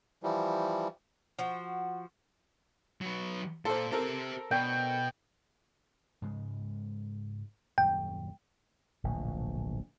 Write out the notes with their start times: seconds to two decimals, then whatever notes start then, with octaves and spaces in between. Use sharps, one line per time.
0.23 E3 F3 G3
1.39 F3 F#4
3.01 F#3 B4
3.65 A#2 A4 C5 C6
3.91 C4 G4 A4 A#4 C5
4.51 B2 G5
6.22 G#2 C#3 G#3
7.78 D#1 F#2 G3 G5
9.04 D1 A#1 B2